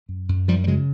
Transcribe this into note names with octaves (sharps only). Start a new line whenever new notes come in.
F#2
F#2
F#2 F3 G3
G3
C#3 F#3 G#3